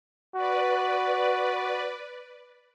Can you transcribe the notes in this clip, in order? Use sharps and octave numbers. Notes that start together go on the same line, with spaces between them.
F#4 B4 D5